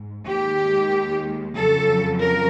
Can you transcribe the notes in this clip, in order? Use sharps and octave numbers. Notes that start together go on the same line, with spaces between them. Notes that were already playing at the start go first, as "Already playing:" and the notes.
Already playing: G#2
D#2 D#3 G#3 G4
F2 C#3 F#3 A4
A#4